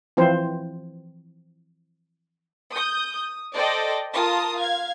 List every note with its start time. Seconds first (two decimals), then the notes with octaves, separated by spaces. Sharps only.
0.17 E3 F3 C4 C5
2.73 D#6 G6
3.16 D#6
3.55 A4 C5 D5 D#5 G5
4.13 F4 A#4 A5 D#6
4.56 F5 G#6